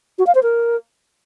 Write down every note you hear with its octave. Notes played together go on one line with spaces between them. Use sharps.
F#4
F5
C5
A#4